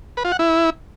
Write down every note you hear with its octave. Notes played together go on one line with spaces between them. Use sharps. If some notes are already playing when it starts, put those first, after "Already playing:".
B4
F4
F#5
E4